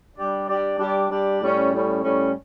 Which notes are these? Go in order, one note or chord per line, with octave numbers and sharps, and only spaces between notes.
G3 D4 G4 D5
G3 D4 G4 D5
G3 D4 G4 D5
G3 D4 G4 D5
A2 G3 C#4
A2 G3 C#4
A2 G3 C#4